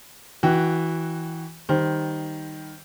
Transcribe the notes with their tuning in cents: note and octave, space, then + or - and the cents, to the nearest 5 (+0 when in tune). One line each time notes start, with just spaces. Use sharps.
E3 -15 F#4 +5 G5 -25
D#3 +0 G3 +0 C5 +0